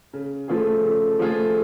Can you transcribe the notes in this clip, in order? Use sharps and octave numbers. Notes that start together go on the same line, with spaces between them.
C#3
F3 A3 F4 G#4
C#3
F3 A3 F4 G#4